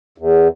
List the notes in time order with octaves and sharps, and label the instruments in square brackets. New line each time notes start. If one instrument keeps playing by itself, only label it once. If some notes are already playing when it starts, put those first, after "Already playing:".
[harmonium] E2